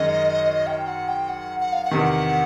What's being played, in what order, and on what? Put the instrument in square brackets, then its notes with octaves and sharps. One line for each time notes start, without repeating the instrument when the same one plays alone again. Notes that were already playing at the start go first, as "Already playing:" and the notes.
Already playing: [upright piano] F#2 D#3 G#3 C#4 [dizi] D#5
[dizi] G5
F#5
G5
F#5
F#5
F5
F#5
[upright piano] E2 C3 D#3